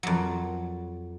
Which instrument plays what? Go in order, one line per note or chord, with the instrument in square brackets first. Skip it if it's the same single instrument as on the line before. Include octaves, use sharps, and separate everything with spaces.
[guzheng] F2 F#3